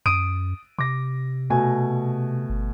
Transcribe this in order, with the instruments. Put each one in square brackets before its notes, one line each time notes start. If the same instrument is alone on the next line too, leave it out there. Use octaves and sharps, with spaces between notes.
[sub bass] F#2 [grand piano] D#6 D7 D#7
[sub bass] C3 [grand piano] D6 A#6
[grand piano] B2 A3 G#5
[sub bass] G1